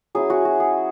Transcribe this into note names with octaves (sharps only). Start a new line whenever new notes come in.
F#3 C#4 E4 G#4
F#4
F#4
G#4